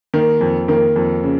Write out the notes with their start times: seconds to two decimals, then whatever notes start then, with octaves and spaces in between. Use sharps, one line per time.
0.14 D#3 A#3
0.41 F2
0.68 D#3 A#3
0.96 F2
1.23 C#3